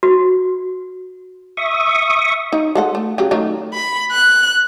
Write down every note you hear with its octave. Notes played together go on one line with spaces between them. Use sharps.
F#4
E5 C#6 D#6
D#4
G#3 A4 F#5
A3
C#3 F#3 G4
D#3 F#3 A3
B5
F#6